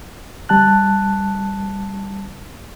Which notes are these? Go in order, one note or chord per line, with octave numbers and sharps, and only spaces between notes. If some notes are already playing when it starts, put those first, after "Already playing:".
G3 A5 F#6